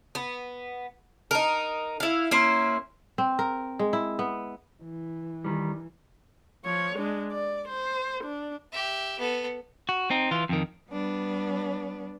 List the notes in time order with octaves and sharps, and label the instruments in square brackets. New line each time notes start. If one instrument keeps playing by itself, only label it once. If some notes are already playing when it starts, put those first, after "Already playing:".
[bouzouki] B3
D#4 A#4
E4 F5
A#3 C#4 E4 C5
[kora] C4
A#4
G#3
E4
B3
[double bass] E3
[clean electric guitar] D#3 G3
[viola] F3 C#5
G#3 D4
D5
C5
D4
[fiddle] G4 E5
B3 A4
[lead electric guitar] F#4
C4 D#4
E3 F4
F2 D#3
[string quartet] G3 B3 D4